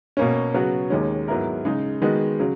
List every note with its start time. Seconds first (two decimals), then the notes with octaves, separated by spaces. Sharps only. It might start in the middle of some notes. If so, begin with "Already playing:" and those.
0.17 B2 A#3 C#4
0.54 C#3 F#3 B3 F#4
0.90 D#2 D#3 G#3 C#4
1.28 G#2 F#3 B3 E4 A#4
1.65 C#3 G#3 D#4
2.02 D#3 G#3 B3 F#4
2.40 C#3 F#3